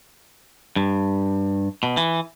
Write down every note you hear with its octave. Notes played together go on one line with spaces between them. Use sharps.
G2
B2
E3